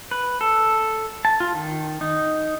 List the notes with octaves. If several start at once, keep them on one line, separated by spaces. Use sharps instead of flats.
B4
A4
A5
F4
D#3
D#4